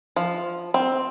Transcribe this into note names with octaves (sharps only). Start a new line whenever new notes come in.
F3
C4